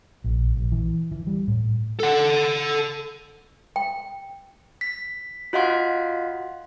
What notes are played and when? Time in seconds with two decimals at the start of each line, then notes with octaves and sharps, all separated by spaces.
0.24 A#1
0.56 A#1
0.72 E3
1.11 E3
1.27 G3
1.48 A2
2.00 A4 F#5
3.76 G5
4.81 B6
5.53 F4 F#4 D#5 F5 F#5 C6